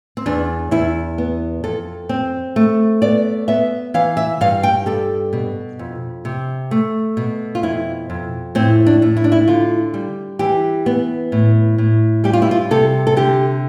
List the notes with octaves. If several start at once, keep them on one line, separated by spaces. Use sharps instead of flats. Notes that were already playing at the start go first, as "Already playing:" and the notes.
C4
E2 D4
E2 E4
B3
F2 A4
C4
A3
B3 D5
B3 E5
E3 F5
E5
G2 F5
G5
G3 A4
B2
F2
C3
A3
B2
F4
F2 E4
F2
A2 C4
D4
A2
E4
D4
E4
D3 F4
G3
E3 G4
B3
A2
A2
G3 G4
F4
E4
F4
C3 A4
A4
D3 G4